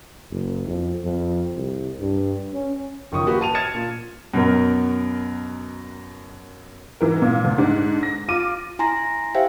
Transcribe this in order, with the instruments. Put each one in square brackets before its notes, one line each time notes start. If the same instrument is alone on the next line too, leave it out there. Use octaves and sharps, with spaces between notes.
[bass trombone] F#1
F2
F2
C2
G2
C#4
[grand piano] F#1 D#3 F3 C#6 D#6
A#3 F#4 G4 B4
A5 D#7 F7
F6 G#6 A6 C#7 E7
A#2
[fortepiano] F#2 B2 A#4
[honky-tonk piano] G#2 E3 A#4
A#2
D2
G#2 D3 D4
A#6
F4 D6 D#7
[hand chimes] E4 G#5 A#5 C6 A#6
G4 C5 E5 F5 G5